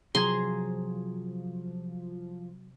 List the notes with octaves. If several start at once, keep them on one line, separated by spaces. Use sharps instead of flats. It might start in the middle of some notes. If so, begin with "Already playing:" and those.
C3 F3 F#3 G#4 A#5 C6 G#6